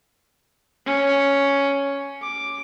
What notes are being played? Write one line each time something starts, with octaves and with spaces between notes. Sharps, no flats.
C#4
D6